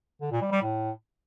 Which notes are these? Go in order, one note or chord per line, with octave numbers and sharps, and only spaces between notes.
D3
A#2
G3
G3
A2